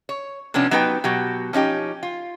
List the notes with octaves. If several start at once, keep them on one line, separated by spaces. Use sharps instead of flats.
C#5
C3 F3 B3 C#4 D4
F#3 B3 D#4 G4 B4 G5
B2 F#3 G4
F3 C#4 D#4 G4
F4